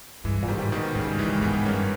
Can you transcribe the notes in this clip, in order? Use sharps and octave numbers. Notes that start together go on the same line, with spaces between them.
G2 E3 G#3
A#2
G#2 D#3 G3
B2 D#3
G#2 C#3
G#2 E3 G#3
G#2 G#3 B3
G2 A#3 C#4